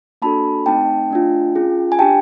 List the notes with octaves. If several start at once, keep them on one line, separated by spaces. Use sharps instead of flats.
A#3 D4 F#4 A4 A5 B5
A3 C4 D#4 G5 A5
A3 D4 F4
C#4 F4 G#4
G#5
D4 G4 G5 A5